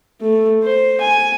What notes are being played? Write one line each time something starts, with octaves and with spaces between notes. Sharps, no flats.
A3
C5
G#5